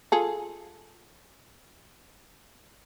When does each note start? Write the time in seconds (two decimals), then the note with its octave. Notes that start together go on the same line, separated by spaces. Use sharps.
0.12 F4 G#4 A4